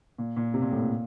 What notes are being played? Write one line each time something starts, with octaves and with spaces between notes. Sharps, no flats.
A#2
A#2
C3
A#2
A2
A#2